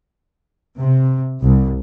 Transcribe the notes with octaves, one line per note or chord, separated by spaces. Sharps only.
C3
C2